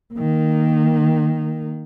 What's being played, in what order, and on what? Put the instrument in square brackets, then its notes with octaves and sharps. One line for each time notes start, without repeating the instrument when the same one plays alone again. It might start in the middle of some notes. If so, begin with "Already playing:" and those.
[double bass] D#3 A#3